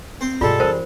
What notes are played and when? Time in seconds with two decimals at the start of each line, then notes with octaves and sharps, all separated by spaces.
0.21 C4 C5
0.41 G2 B2 G3 G#3 F4 A4
0.60 F#2 E3 A#4 C5